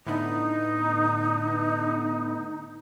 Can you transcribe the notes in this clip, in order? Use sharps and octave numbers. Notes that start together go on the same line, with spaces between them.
A2 D3 B3 D#4